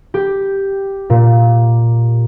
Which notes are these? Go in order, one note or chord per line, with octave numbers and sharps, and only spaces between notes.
G4
A#2